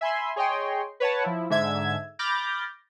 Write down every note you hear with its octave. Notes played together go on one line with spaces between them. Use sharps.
E5 G#5 B5 C6
G#4 C#5 D#5 G5 C6
B4 C#5 F#5 A5
F3 E4
G#2 D3 E5 G#6
B5 D6 F6 G6 A6 A#6